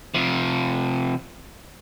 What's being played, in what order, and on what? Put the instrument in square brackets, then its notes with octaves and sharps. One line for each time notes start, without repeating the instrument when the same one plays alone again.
[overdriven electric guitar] C3 F3